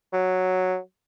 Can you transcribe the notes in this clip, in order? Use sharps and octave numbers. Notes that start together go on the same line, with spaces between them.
F#3